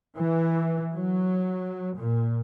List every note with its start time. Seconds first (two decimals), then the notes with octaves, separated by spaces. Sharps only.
0.16 E3
0.93 F#3
1.96 A#2